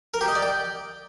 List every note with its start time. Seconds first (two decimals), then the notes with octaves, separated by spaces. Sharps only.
0.14 A#4
0.21 G4
0.28 D#5
0.35 D5
0.43 G5